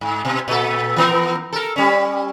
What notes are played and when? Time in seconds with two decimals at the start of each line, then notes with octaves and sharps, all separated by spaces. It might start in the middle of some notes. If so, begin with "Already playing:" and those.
0.01 G#2
0.25 B2
0.48 A#2 A4
0.96 E3 B3 A#4
1.53 A4 A#4
1.76 G3 C#4